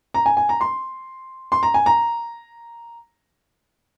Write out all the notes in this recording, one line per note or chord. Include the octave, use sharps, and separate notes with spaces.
A#5
G#5
G#5
A#5
C6
C6
A#5
G#5
A#5